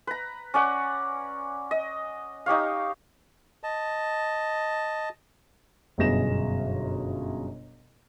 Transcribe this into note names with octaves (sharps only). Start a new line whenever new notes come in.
B4 A#5
C#4 D5 F#5
D#5
D#4 G4 C#5 F5
D#5 A5
G1 F#2 B2 G#4 A#6 E7